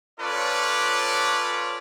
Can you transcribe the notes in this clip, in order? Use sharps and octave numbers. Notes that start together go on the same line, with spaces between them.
C#4 F4 A4 B4 C#5 D5